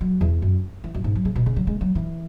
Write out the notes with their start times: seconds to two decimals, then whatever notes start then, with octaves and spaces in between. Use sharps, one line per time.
0.01 F#3
0.21 E2
0.42 F#2
0.84 E3
0.94 F#2
1.04 G#2
1.15 F#3
1.25 C#3
1.36 B2
1.46 C#3
1.56 F#3
1.67 G#3
1.81 F#3
1.95 E3